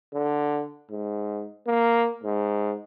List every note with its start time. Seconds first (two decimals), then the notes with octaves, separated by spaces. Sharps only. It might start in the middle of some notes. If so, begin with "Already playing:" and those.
0.14 D3
0.91 G#2
1.67 A#3
2.24 G#2